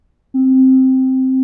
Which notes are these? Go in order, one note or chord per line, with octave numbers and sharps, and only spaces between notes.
C4